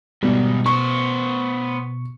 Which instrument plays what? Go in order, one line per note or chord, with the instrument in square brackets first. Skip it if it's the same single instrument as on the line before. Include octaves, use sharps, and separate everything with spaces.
[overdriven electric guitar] G#2 D#3 [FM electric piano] B2 [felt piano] G3
[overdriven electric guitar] B3 C5 [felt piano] C#6